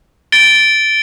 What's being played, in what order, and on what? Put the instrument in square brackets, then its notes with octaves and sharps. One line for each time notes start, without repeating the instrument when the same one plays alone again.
[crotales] A6 D7 G7